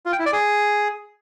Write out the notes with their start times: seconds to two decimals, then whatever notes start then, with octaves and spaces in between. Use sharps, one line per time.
0.06 F4
0.12 G5
0.19 E4
0.26 D5
0.33 G#4